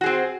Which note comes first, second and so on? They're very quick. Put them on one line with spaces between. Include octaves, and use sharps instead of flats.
F#4 G#4 C4